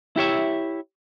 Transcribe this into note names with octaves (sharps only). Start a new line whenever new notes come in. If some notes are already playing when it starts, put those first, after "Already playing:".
E4 G4 C#5 E5